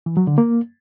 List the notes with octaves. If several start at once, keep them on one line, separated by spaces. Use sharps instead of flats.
E3
F#3
D3
A#3